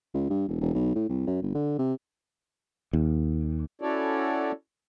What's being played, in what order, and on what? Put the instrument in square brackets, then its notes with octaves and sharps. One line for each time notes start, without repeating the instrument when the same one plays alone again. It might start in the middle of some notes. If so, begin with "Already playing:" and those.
[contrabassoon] C#2
G2
E1
E1
B1
A2
C2
F#2
G1
D3
C3
[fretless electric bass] D#2
[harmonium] C#4 E4 F#4 A4 C#5 D5